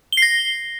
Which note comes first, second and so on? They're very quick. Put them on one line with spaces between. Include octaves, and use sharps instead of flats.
G7 C7 A#6